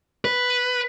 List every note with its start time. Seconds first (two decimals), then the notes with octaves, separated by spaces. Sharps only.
0.25 B4